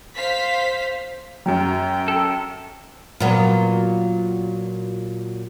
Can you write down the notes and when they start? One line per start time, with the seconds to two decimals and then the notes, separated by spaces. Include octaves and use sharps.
0.16 C5 F5 B6
1.46 F#2 F#3 G5
2.08 A4
3.20 A#2 F#3 B3